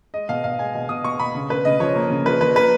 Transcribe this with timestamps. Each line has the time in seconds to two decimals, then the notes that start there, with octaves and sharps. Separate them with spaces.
0.14 G#3 D#5
0.29 B2 F5
0.44 B2 F5
0.59 G#3 G#5
0.74 B2
0.89 B2 D#6
1.04 B2 C#6
1.19 B2 B5
1.35 C#3
1.50 C#3 B4
1.65 C#3 D#5
1.80 F3 C#5
1.95 A#3
2.10 C#3
2.26 F3 B4
2.41 F3 B4
2.56 A#3 B4